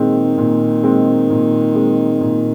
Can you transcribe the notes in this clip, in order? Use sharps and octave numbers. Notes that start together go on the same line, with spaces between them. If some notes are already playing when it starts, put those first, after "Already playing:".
Already playing: A#2 D#3 G#3 C4
A#2
G#3 C4
A#2
G#3 C4
A#2